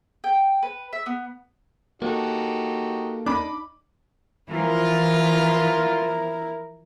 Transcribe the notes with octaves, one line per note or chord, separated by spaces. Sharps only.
G5
B4
E5
B3
A#3 D#4 F#4 G4 A4
D4 D#4 B5 D6
E3 F3 E4 F4 A#4